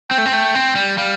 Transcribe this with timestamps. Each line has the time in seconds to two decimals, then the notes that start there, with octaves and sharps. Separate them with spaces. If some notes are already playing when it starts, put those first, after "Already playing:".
0.11 C4 G5
0.18 A3
0.26 C4
0.33 A3
0.55 C4
0.75 G3
0.98 G3 F5